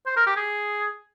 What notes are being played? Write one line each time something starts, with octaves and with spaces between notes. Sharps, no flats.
C5
A#4
G4
G#4